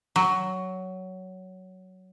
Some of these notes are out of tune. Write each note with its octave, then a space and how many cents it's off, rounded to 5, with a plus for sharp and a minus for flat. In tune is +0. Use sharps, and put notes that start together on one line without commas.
F#3 +10